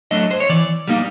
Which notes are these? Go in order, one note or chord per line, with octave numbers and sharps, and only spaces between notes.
F#3 A3 D4 D#5
C5
C#5
E3 D5
G3 A#3 D#4